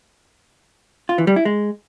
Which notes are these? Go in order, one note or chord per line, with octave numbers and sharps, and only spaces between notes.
F4
E3
G3
E4
G#3